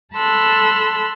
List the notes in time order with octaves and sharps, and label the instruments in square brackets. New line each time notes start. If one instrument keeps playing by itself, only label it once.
[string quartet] A4 A5 B5 C6 E6 F#6